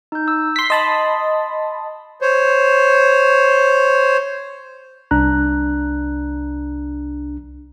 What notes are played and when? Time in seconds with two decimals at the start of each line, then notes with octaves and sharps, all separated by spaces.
0.12 D#4 G6
0.28 E6
0.56 C6 B6
0.70 D#5 A5 B5 C6 D#6
2.22 C5 C#5
5.11 C2 D4 A#5 F#6